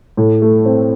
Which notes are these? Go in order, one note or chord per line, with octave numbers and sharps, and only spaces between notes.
A2
A3
C4